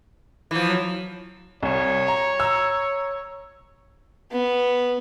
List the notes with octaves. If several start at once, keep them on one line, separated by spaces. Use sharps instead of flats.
E3 F3
F#3
C2 C#5
A#5
A#5 E6
B3